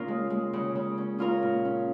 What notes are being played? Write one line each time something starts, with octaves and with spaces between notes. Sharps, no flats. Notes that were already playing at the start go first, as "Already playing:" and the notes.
Already playing: C#3 A#3 C#4 F4 A#4
G#3
G#3
C#3
C#3
C#4
C#4 F4 A#4
A#2
C#4